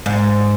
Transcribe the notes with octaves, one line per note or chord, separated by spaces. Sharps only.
G#2